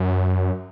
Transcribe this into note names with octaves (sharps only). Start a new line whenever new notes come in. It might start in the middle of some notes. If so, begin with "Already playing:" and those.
Already playing: F#2